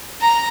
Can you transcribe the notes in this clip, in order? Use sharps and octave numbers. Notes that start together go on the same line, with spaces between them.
A#5